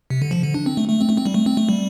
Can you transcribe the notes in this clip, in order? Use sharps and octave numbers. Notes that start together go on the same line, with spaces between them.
C3
D3
F3
D3
D4
C4
A3
A3
C4
A3
C4
G3
A3
C4
A3
G3